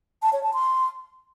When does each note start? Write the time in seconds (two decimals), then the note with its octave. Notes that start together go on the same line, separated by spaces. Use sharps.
0.22 A5
0.33 C#5
0.43 A5
0.54 C6